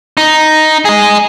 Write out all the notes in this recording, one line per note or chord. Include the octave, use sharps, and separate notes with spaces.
D#4
G#4 D#5